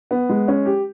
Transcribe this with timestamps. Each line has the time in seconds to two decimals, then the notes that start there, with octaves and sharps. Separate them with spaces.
0.11 B3
0.29 G#3
0.48 C#4
0.66 G4